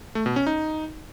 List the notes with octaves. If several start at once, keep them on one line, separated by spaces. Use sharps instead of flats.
A3
B2
C#4
D#4